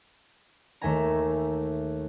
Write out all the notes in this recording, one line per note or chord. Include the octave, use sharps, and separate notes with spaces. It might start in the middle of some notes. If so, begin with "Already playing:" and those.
D#2 A3 E5 G#5 A#5